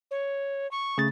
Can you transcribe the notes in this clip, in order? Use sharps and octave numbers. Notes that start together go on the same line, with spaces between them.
C#5
C#6
C#3 A3 A6